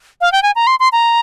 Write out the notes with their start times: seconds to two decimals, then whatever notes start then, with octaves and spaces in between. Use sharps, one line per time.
0.21 F5
0.32 G5
0.43 G#5
0.56 A#5
0.67 C6
0.80 C6
0.92 A#5